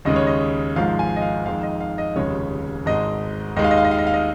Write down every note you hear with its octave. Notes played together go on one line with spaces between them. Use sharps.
D#2 C#3 G#3 D#5
C#5
D#5
G#1 G#2 F3 G#3 F5
G#5
D#5
F5
F2 D#3 G#3 F5
D#5
F5
D#5
F1 D#2 C#3 G#3 C#5
G#1 G#2 G#3 D#5
D#2 D#3 G#3 D#5
F5
D#5
F5
D#5
F5
D#5
F5
D#5